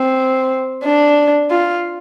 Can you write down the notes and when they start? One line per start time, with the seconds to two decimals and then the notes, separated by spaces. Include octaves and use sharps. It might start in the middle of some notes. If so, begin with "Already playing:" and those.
Already playing: C4
0.84 D4
1.51 F4